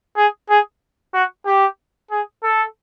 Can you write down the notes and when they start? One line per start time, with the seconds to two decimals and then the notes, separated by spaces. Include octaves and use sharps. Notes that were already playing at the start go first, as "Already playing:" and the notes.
0.17 G#4
0.50 G#4
1.14 F#4
1.46 G4
2.11 G#4
2.44 A4